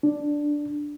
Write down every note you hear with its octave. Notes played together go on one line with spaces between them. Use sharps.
D4